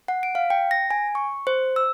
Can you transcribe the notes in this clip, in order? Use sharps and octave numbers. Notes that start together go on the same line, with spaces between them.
F#5
D7
F5
G5
A#6
G#5
C#6
C5
E6